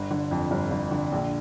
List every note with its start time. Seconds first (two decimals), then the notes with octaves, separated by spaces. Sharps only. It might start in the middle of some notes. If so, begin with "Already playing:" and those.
Already playing: G1
0.11 D3
0.31 F2
0.51 G1
0.71 G1
0.91 D3
1.12 A#1